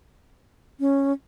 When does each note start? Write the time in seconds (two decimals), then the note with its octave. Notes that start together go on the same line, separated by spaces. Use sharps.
0.80 C#4